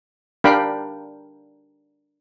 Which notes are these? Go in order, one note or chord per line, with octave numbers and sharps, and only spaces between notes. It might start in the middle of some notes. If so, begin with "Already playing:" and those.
D4 G4 A#4 F5 G5 B5